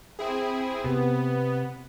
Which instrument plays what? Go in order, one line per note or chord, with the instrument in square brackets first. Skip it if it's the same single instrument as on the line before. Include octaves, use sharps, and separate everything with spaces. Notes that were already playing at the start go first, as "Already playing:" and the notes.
[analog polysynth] C4 E4 G#4
[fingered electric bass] C3 [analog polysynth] B3